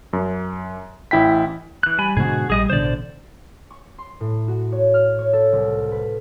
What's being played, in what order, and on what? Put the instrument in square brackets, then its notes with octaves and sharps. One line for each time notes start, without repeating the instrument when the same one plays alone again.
[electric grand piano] F#2
A1 E4 G5 B6
[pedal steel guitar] E3 F#6
G3 G#5 B5
[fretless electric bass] G#2 B2 D3 [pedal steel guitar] F#4 G#4
[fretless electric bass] A#1 G3 [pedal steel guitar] G#4 D#5 D#6
[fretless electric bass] A1 B2 D3 [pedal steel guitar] C5 D5
[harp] C#6
C6
A2
F#4
C#5
F6
C#5
A4
C2
B4